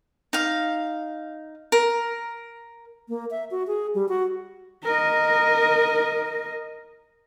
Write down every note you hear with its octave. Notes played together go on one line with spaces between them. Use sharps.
D#4 F5
A#4
A#3
E5
F#4
G#4
G3
F#4
A#4 D#5